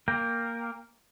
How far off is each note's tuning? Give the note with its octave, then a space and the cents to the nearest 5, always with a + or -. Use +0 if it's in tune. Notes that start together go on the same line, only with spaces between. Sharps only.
A#3 +0 A#4 +0 G5 +20